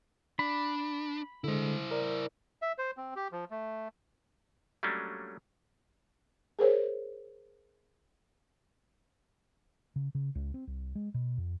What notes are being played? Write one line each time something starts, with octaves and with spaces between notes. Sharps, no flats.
D4 B5
D3 G#3 E4 C5
A#4 D5
E5
C5
C4
G4
F3
A3
F#3 G3 A3 A#3 C#4 D4
G#4 A#4 C5 C#5
C#3
C#3
C#2
C4
C2
G#3
B2
F2